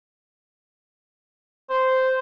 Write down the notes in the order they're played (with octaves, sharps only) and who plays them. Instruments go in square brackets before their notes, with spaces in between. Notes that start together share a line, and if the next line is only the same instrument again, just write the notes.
[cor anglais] C5